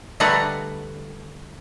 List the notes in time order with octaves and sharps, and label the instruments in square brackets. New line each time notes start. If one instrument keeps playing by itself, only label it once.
[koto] D3 G3 A3 F#4 B4 A#5